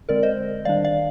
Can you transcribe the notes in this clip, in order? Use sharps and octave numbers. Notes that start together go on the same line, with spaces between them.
D3 G#3 C4 A#4 D5
C5 D#5
D#3 G3 D4 D5 F5
D5 F5